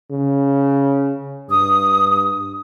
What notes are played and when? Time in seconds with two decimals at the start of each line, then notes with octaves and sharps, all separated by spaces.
0.11 C#3
1.49 G2 D#6